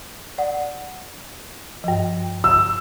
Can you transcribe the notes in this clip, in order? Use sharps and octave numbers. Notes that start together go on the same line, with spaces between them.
D5 F#5
G2 F3
E6